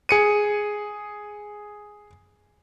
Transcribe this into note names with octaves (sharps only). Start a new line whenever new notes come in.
G#4 C#7 D#7